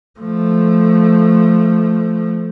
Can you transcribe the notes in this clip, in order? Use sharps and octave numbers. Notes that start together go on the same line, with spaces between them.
F3 A3